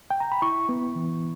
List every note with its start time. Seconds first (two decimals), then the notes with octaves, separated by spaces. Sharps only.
0.10 G5
0.20 A#5
0.32 B5
0.42 E4 C#6
0.69 B3
0.95 E3